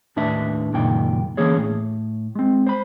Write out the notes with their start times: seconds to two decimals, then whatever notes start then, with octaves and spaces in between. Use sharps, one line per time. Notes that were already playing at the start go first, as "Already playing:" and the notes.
0.16 D#2 A2 D4 B4 E5
0.73 C#2 F#2 A#2 D#3 G5
1.37 D3 E3 A#3 C#4 G#4 C#5
1.57 A2
2.35 G#3 C4
2.67 C5 B5